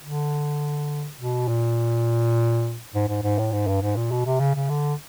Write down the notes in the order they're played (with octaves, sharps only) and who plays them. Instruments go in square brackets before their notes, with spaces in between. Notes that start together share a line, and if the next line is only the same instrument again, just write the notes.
[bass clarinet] D3
B2
A#2
G#2
G#2
G#2
A2
G#2
G2
G#2
A#2
B2
C3
C#3
C#3
D3